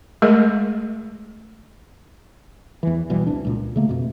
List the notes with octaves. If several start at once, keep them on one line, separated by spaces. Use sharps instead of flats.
G#3 A3 G#4 A#4 D#5
E2 E3
B1 B2 E3 G3
E1 C2 D4
C#2 A#2
C#3 A3 A#3
F2 B2